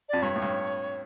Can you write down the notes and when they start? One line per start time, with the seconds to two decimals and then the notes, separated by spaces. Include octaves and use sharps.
0.09 F2 D5
0.22 G2 C#5
0.36 A2
0.42 G2